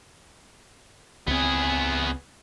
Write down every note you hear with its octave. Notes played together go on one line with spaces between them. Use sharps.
C#2 B3 C4 G#4